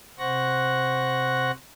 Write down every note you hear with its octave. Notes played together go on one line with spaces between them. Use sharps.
C3 C5 F#5 C#6 F#6 A#6